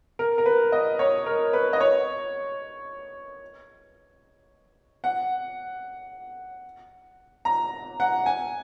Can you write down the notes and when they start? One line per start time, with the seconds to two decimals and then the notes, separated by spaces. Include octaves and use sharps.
0.19 A#4
0.38 A#4
0.46 B4
0.72 D#5
0.99 C#5
1.26 A#4
1.53 B4
1.73 D#5
1.80 C#5
5.04 F#5
7.45 A#5
8.00 F#5
8.26 G#5